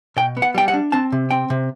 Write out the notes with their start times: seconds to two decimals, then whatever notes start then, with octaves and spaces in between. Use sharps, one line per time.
0.17 B2 G5
0.37 B3
0.42 F#5
0.54 G3 G5
0.68 F#5
0.74 D4
0.92 C4 A5
1.12 C3
1.31 C4 G5
1.50 C3